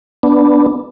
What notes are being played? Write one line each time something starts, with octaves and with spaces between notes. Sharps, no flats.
B3 D4